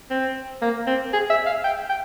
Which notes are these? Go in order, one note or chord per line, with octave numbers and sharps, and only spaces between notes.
C4
A#3
C4
G#4
E5
F5
G5
G5